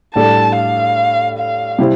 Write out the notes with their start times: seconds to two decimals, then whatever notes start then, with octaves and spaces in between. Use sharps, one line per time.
0.15 A2 G3 D4 A4 D5 A5
0.55 F5
1.38 F5
1.79 C3 G3 C4 E4